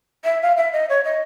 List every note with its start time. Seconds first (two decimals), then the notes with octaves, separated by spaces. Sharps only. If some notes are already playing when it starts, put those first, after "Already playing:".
0.24 E5
0.42 F5
0.57 E5
0.73 D#5
0.89 C#5
1.04 D#5